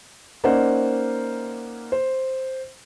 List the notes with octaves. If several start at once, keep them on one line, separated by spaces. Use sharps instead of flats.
A#3 C#4 D#4 C5 D5 F#5
C5